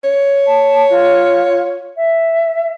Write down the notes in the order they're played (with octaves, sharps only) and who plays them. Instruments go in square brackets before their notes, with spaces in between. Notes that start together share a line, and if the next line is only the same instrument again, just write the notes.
[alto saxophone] C#5
[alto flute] A5
F4
E5